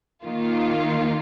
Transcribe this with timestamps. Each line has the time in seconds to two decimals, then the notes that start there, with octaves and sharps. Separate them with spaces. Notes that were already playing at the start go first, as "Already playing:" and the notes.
0.24 D#3 A#3 F4